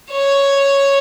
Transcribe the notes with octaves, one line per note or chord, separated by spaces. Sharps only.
C#5